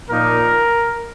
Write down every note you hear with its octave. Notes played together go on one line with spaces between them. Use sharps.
A#2 F3 A#3 D#4 A#4